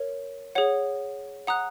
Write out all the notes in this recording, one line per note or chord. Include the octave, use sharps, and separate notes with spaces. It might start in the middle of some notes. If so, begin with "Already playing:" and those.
Already playing: A#4 C#5
G#4 C#5 F#5
F#5 A#5 D#6 F#6